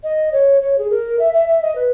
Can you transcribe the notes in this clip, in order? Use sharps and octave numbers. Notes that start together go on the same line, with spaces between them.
D#5
C#5
C#5
G#4
A#4
E5
E5
E5
D#5
B4